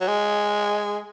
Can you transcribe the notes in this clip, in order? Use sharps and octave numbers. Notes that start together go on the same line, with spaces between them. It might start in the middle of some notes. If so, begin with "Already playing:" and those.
F#3
G#3